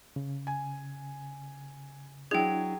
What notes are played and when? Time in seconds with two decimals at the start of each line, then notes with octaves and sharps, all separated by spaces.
0.16 C#3
0.47 G#5
2.31 F#3 D4 E4 G#4 G5 G#6